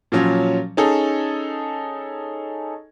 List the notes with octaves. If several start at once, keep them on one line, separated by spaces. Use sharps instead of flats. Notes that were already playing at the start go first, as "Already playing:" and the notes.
A#2 F3 F#3 C#4
C#4 D#4 G#4 A4